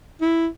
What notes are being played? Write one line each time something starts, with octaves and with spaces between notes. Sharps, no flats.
E4